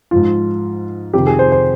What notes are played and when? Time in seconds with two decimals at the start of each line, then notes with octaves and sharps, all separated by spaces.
0.11 G#2 F3 F4
1.14 F2 C3 D#3 G4
1.27 G#4
1.39 C5
1.52 C5